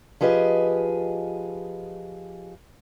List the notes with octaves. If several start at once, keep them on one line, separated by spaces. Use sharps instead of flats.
F3 G4 G#4 B4 D#5